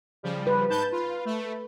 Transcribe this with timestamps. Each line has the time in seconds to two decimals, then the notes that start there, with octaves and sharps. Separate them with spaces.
0.23 C#3 F3 G3
0.47 B4
0.69 G#2 A5 G6
0.92 F4
1.25 A3